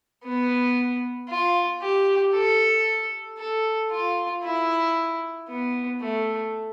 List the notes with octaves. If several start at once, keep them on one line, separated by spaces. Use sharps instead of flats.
B3
F4
G4
A4
A4
F4
E4
B3
A3